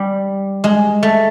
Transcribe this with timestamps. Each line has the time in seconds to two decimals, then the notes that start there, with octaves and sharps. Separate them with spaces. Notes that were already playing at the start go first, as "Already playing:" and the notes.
Already playing: G3
0.64 G#3
1.03 A3